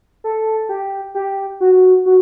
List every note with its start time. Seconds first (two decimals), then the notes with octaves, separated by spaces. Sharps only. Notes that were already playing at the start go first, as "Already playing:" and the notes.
0.24 A4
0.69 G4
1.15 G4
1.61 F#4
2.06 F#4